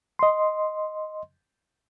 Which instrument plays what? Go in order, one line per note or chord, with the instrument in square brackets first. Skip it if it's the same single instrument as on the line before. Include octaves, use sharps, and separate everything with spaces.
[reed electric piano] D#5 C6